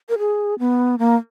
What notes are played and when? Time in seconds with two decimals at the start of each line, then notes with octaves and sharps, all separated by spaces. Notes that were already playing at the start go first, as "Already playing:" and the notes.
0.09 A#4
0.18 G#4
0.59 B3
0.99 A#3